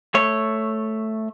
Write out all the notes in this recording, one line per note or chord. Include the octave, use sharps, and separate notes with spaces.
A3 C#5